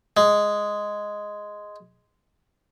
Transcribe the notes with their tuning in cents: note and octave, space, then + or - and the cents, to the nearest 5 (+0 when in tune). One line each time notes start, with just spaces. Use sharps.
G#3 +0